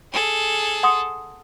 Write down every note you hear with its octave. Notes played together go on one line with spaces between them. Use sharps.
G#4 A4
F#5 C6 D#6